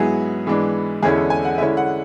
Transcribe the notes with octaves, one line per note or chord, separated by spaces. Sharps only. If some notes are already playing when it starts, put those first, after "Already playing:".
Already playing: G#2 F#3 B3 E4 G#4
G#2 E3 G#3 B3 D4
E2 D3 G#3 C#4 E4 G#4
A4
G#5
F#5
D3 G#3 C#4 E4 E5
F#5